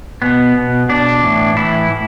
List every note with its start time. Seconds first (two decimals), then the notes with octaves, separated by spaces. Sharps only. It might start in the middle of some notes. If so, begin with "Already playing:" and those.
0.22 B2 B3
0.56 B2
0.89 B2 D4
1.22 A2 E3
1.56 A2 E3 E4
1.90 A2